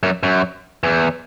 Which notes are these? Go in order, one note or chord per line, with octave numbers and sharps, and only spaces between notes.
F#2
F#2
E2